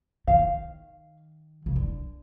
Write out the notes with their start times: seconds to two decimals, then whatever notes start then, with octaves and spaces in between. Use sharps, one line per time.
0.27 D#3 F5
1.66 C#3
1.76 D3